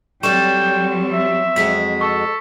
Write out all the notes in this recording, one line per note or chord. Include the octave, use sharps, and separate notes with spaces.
F#3 G3 C4 A4 D5 G5 C#6 E7
E5
F2 G#3 F#4 B6
A4 C#6